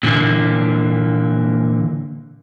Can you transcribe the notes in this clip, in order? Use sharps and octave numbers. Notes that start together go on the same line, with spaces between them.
A#2 D3 E3 A#3